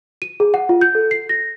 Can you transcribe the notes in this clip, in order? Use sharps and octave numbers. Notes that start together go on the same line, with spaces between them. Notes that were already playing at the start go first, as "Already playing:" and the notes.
D#7
G#4
F#5
F4
G6
A4
C7
A#6